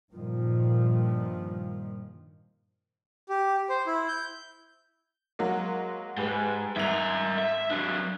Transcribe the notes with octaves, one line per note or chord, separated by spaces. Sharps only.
G2 A#2 D#3 F3
G4
C5
E4
G6
F#3 G#3 A#3
G#2 G4 B4
G#1 A#4 E5 F7
E5
F#3 D4